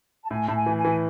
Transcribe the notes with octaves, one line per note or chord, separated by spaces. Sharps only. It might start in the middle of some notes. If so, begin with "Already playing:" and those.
A5
A2 G#5
A2 A5
G#5
E3
G#5
E3